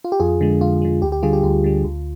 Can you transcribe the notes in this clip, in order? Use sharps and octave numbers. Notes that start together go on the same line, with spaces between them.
F4
G4
F2 F4 G#4
D3 G#3
F2 F4
D3 G#3
D2 G4
G4
D3 G3 F4 G#4
G4
D2 F4
D3 G3
D2